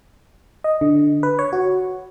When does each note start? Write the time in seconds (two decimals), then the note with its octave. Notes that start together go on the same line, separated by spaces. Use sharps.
0.64 D#5
0.81 D3
1.23 B4
1.39 C#5
1.53 F#4